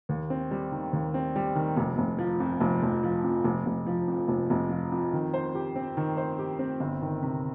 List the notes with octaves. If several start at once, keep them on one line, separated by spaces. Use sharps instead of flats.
D#2
C4
G3
D#3
D#2
C4
G3
D#3
F1
F1
F3
F2
F1
F1
F3
F2
F1
F1
F3
F2
F1
F1
F3
F2
D#3
C5
G4
C4
D#3
C5
G4
C4
G1
D#3
C3